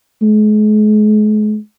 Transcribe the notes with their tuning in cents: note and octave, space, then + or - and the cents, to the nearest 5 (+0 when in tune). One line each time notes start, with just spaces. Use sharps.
G#3 +40